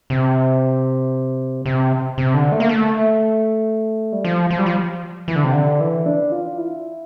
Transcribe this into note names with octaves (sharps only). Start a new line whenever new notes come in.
C3
C3
C3
D3
A3
A#3
A3
G3
F3
F3
G3
F3
E3
D3
C3
D3
E3
D4
F4
E4